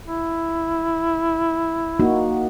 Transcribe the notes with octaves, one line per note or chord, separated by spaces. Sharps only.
E4
A#3 D#4 F#4